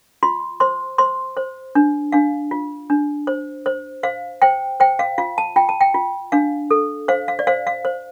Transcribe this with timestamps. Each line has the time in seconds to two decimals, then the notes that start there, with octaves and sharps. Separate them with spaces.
0.23 F4 C6
0.60 C5 C6
0.98 C5 C6
1.37 C5
1.75 D4
2.12 D4 F5
2.51 F4
2.90 D4
3.27 C5
3.66 C5
4.03 C5 F5
4.42 C5 G5
4.80 C5 G5
4.99 F5
5.18 F4 F5
5.38 A5
5.56 F4 G5
5.69 A5
5.81 G5
5.94 F4
6.32 D4 F5
6.71 A4
7.08 C5 F5
7.28 F5
7.39 D5
7.47 C5 F5
7.67 F5
7.85 C5